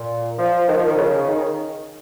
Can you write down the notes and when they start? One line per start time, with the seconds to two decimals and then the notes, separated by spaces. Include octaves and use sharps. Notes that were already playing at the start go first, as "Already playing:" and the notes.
Already playing: A#2
0.38 F3
0.68 D#3
0.77 F3
0.87 D#3
0.97 C#3
1.28 D#3